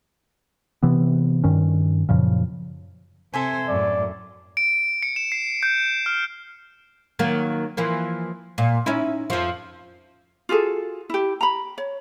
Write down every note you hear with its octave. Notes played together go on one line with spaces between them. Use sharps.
C3 E3 B3
G2 D#3 C#4
F#2 A#2 C#3 F3
C3 A4 C5 E5 G#5
F#2 A2 D5
D7
C#7
E7
C7
G6
F6
D#3 F#3 A#3
E3 F3 A#3
A#2
C#4 D#4 E4
F2 F3
F4 F#4 G#4 A4
E4 G4
A#5 B5
C#5